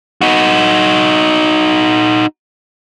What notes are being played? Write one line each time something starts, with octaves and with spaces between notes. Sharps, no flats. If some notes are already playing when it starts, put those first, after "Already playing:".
D#4 F#4